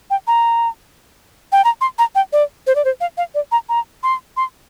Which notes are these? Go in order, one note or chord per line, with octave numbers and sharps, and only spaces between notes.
G5
A#5
G5
A#5
C6
A#5
G5
D5
C5
D5
C5
F5
F5
D5
A#5
A#5
C6
C6